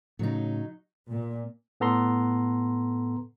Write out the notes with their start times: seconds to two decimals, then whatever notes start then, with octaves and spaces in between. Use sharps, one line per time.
0.19 A2 C#3 F#3 D#4
1.08 A#2
1.80 A2 B3 A4 A#5 C6